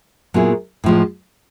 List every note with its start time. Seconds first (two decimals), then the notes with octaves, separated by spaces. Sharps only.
0.34 A#2 F#3 B3 E4 G#4
0.84 A2 F3 G#3